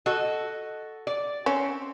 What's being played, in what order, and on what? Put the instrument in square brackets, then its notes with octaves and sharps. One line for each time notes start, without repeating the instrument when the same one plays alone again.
[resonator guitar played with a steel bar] F#4 A4 D#5
D5
[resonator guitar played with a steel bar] C4 [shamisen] C#4